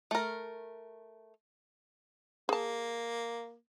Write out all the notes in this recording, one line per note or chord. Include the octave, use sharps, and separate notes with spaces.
A3 A#4
A#3 G#4 A5